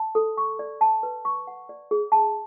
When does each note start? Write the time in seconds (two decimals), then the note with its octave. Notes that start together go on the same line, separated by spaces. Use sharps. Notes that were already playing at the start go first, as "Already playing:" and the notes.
Already playing: A5
0.15 A4
0.37 C#6
0.59 D5
0.81 A5
1.03 B4
1.25 C#6
1.47 F#5
1.69 D5
1.91 G#4
2.12 A5